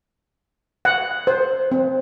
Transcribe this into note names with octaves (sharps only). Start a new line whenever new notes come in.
F#5
C5
C4